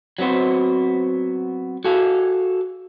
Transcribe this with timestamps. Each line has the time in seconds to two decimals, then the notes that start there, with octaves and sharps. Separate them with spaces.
0.19 F#3 B3 C4 F#4 C5
1.84 F#4 G#4 A4 F5